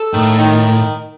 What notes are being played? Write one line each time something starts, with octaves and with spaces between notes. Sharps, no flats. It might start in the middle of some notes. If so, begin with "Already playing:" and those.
Already playing: A4
A2 D#3
D#3
D#3